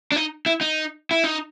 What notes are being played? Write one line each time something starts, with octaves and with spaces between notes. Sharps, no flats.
D4
D#4
E4
D#4
E4
D#4